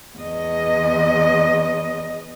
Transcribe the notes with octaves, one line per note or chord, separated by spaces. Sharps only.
E2 D#5